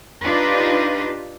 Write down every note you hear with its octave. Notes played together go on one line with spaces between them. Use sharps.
D4 D#4 F4 G4 B4